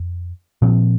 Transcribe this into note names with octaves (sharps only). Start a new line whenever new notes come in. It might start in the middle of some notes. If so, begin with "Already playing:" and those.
Already playing: F2
A#2 F3 C4